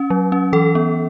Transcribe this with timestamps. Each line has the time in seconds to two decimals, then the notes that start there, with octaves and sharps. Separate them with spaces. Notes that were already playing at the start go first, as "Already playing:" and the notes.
Already playing: C#4
0.10 F#3
0.32 C#4
0.53 E3 A4
0.75 B3